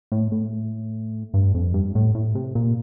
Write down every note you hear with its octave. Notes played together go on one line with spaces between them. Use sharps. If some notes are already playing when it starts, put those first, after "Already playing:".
A2
A2
G2
F2
G2
A2
A2
C3
A#2